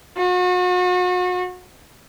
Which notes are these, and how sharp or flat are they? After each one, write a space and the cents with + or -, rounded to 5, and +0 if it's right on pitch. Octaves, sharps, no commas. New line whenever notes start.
F#4 -35